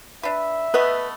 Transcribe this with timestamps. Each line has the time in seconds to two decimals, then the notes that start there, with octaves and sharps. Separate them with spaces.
0.23 D4 B4 E5
0.74 A3 B3 B4 D#5